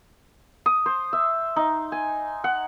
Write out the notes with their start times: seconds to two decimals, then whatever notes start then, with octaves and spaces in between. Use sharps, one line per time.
0.66 D#6
0.86 C5
1.13 E5
1.56 D#4
1.92 G#5
2.44 F#5